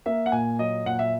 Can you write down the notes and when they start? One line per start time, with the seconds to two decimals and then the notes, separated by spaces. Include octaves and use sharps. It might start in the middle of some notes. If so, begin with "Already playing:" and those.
0.06 A#3 E5
0.26 F#5
0.32 A#2 G#5
0.59 F#3 D#5
0.86 A#2 F#5
0.99 E5